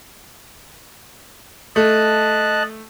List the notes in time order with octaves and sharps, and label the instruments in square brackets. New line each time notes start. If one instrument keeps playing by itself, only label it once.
[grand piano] A3 [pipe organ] D#5 A5 F#6